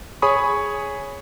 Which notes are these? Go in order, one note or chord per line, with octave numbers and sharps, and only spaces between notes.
G#4 C#5 G#5 B5 C#6 D#6